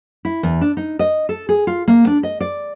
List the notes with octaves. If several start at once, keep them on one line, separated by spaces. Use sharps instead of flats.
E4
E2
D4
D#4
D#5
A4
G#4
F4
A#3
D4
D#5
D5